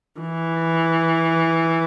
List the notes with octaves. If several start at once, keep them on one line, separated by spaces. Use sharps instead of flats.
E3